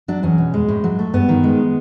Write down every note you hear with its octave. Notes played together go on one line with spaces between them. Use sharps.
F#3 D4
E2 C#4
B2
G#3
A2
F#3
A3
G2 B3
D#3
G#3